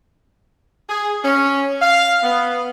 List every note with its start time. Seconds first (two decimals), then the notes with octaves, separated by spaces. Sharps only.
0.90 G#4
1.24 C#4
1.82 F5
2.23 B3